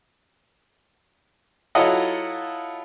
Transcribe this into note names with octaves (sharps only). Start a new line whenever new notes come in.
F#3 E4 F4 A4 D#5 F#5